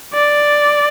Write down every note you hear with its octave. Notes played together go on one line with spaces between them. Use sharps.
D5